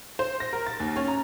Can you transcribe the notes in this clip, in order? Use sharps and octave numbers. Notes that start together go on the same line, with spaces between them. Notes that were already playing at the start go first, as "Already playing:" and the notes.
C5
A#6
A#4
A6
D#2
C#4
A#5